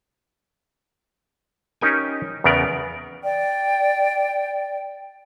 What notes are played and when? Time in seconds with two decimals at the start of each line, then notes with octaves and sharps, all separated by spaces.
1.81 C#4 D#4 G4 A#4 G5 G#5
2.44 E2 C#3 B3 A#4 D5
3.24 D5 G5